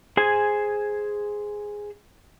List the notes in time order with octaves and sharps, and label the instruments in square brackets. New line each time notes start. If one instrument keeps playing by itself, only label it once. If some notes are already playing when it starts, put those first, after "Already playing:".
[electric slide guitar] G#4 C5 G#5